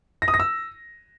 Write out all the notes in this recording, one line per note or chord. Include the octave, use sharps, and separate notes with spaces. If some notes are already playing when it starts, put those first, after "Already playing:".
A#6
D#6
A#6
E6